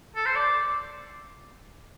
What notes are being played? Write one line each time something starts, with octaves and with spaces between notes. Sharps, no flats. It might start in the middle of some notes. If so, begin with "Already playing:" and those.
A4
C5
D5